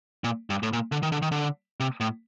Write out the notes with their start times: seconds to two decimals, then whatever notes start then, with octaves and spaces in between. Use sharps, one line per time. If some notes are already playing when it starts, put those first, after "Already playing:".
0.24 A#2
0.50 G2
0.63 A2
0.73 A#2
0.92 D3
1.03 D#3
1.12 D3
1.22 D#3
1.32 D3
1.80 C3
2.00 A2